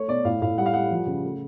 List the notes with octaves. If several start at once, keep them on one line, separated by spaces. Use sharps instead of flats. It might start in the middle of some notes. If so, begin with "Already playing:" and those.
Already playing: A3 C#5
B2 D5
A2 F5
A2 F5
G3 F#5
F5
G3 F#5
F3
C#3
A3